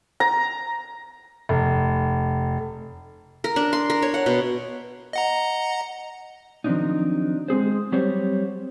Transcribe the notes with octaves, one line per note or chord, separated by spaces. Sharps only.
A#5
F1
A#4
D4
C6
A#4
C#5
F#5
B2
D#5 F#5 A#5
D#3 F3 F#3 C4 D4 D#4
G#3 C4 G#4 C5
F#3 G3 C4 C5 C#5